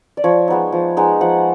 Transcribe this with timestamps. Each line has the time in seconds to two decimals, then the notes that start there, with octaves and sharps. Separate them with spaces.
0.17 D5
0.24 F3 C#5
0.48 G#3 B3 D#4
0.72 F3
0.97 G#3 B3 D#4
1.21 F3 F#5